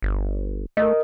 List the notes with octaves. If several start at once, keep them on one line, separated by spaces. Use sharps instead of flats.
G1
A3 A#4 D#5